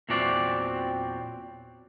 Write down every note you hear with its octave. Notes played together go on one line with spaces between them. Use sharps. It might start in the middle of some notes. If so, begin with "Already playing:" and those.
E2 A#2 E3 F#3 C4 D5